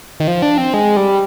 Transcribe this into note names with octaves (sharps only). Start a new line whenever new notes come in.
D#3
F3
D4
C4
G#3
G3